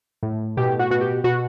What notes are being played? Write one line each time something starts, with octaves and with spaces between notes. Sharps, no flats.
A2
B2 G4
F#4
B2 F#4
G4
B2 F#4